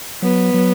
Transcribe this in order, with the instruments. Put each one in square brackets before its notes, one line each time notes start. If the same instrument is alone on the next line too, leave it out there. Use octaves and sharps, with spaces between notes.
[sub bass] F#3 [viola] B3
[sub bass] F#3